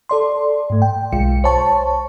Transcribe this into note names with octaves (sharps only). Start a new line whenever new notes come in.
A4 D5 C6
G#2 A3
G5
B1 G#3 F4 C#7
C5 C#5 A5 C#6